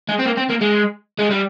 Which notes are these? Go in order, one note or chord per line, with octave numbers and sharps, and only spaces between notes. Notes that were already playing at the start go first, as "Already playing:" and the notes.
G#3
C4
A#3
C4
A#3
G#3
G#3
G3